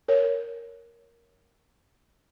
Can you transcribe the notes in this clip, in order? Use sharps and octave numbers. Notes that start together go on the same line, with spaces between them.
A#4 C#5